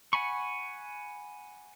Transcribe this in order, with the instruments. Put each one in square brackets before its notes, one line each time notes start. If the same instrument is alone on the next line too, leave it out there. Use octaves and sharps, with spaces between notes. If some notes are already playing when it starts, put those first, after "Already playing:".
[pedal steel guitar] F#5 G#5 B5 C#6